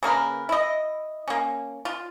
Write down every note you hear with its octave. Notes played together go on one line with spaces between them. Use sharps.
C#3 A#3 A#4 B4
E4 D#5
A#3 C#4
F4